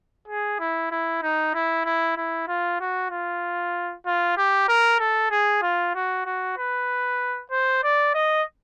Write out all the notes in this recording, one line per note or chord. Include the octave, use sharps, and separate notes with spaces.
G#4
E4
E4
D#4
E4
E4
E4
F4
F#4
F4
F4
G4
A#4
A4
G#4
F4
F#4
F#4
B4
C5
D5
D#5